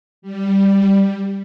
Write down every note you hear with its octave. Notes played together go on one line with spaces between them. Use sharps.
G3